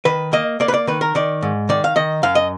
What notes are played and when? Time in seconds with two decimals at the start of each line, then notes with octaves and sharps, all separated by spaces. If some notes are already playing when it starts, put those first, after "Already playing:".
0.05 D#3 B4
0.33 A#3 D#5
0.60 A#3 D5
0.68 B4
0.74 D5
0.87 D#3 B4
1.01 A#4
1.15 D#3 D5
1.42 G#2
1.69 D#3 D5
1.84 F5
1.96 D#3 D#5
2.23 F#2 F5
2.35 D#5